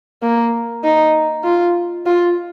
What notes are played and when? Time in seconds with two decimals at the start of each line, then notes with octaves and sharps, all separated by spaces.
0.22 A#3
0.83 D#4
1.44 F4
2.06 F4